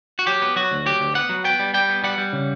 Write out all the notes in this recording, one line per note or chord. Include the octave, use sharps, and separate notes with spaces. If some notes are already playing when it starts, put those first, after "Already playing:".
F#4
F#3 G4
B3
F#3 F#4
D2
F#3 G4
D2
B3 F#5
F#3
B3 G5
G3
G3 G5
B3
G3 F#5
G3
C#3